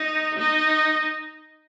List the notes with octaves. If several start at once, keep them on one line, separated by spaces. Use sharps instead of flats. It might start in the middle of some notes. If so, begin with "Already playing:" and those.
Already playing: D#4
D#4